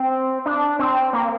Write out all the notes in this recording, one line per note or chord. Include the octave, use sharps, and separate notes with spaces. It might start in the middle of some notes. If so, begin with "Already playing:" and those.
Already playing: C4
D4
C4
A#3